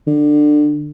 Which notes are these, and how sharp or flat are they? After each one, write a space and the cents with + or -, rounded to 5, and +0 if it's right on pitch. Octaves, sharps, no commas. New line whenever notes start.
D3 +20